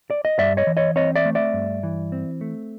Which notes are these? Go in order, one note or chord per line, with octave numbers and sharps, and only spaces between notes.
D5
D#5
G2 D5 E5
C#5 D#5
E3
C#5 D#5
C4 C#5 D#5
D5 E5
A3
D5 E5
G2
E3
C4
A3